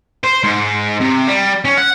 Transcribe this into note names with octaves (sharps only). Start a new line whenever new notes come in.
C5
G#2
C3
G3
C#4
F#5